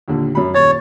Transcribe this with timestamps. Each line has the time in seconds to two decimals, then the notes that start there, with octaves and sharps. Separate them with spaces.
0.08 D#2 A#2 D3
0.35 F#2 B5
0.55 D#1 C#5 A6